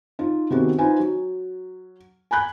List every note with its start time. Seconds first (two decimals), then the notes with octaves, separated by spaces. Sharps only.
0.19 D#4 F4
0.50 C3 D#3 B3 C4 F#4 G#4
0.78 D#4 F4 B4 C5 G#5
0.99 F#3
2.31 G#5 B5 F#6 G6